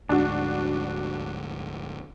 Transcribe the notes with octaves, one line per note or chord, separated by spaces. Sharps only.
D2 G#2 D4 F#4